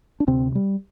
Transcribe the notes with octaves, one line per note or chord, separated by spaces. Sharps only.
D4
D2 C3 C4
G3